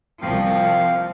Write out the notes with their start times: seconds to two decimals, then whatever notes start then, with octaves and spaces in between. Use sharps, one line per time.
0.21 C2 F3 A#3 C4 F5